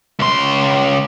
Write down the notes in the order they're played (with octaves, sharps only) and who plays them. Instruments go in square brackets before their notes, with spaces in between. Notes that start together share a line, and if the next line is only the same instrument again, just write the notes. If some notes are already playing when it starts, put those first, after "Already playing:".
[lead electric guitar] C#2 C6